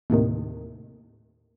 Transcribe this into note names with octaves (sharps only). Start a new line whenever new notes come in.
D#2 A2 C3 D#3